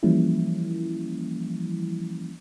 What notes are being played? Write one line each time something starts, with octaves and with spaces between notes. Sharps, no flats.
E3 F3 G3 A#3 C#4 E4